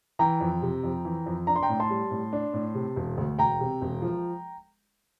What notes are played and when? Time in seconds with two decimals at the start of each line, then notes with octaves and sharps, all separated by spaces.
0.19 E3 G5 A#5
0.40 F2
0.62 C3
0.84 F2
1.05 E3
1.26 F2
1.47 D4 A#5
1.56 C6
1.63 G5 A#5
1.69 A2
1.80 A5 C6
1.90 G3
2.11 A2
2.33 D4
2.53 A2
2.75 C3
2.96 E1
3.18 D2
3.38 E1 G5 A#5
3.60 C3
3.81 E1
4.02 F3